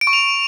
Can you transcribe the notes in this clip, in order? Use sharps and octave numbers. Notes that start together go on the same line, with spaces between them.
D7
C#6
F7